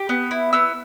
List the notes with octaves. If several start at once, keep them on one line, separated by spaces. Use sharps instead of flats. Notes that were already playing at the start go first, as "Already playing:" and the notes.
Already playing: G4
B3
E4
B3 E6